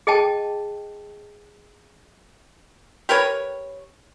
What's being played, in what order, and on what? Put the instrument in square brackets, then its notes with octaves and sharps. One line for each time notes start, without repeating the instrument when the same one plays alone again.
[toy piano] G#4 D#5 G5 A5
[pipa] G4 A#4 B4 C#5